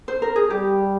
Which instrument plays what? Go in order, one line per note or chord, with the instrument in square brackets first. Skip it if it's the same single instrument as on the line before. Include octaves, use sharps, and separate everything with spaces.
[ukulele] C5
A#4
G#4
[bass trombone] G3 [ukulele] G4